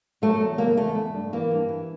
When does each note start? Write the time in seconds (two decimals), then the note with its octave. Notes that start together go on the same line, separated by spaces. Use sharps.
0.22 F#3 A3
0.41 E2
0.58 C#3 A#3
0.77 E2 A3
0.95 A3
1.14 G2
1.33 E3 A#3
1.51 G2
1.69 E3